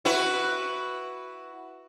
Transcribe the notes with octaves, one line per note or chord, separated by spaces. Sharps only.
E4 F#4 B4